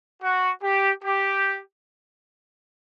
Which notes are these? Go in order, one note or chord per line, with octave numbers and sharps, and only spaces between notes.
F#4
G4
G4